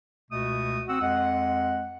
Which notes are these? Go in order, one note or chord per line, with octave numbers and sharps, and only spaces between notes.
C#2 B2 A3 F#4 D#6
C4 F#4 F#5 E6
F2 G#3 F#5